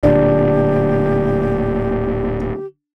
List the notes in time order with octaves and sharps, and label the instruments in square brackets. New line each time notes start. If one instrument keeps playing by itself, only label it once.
[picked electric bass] D1 D2 A#2 [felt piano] D4 [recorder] G4